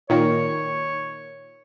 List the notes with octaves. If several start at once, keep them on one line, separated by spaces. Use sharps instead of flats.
A#2 D#3 C#5